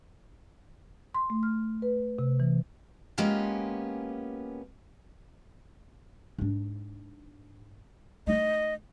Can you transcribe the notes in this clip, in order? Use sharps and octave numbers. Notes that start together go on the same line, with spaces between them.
C6
A3
F6
B4
C3
E3
G#3 A#3 B3 C#4 F4 G4
G#2 D4
A3 D#4 D#5